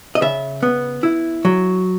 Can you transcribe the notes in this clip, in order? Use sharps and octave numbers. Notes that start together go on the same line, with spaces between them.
D#5
C#3 E5
B3
E4
F#3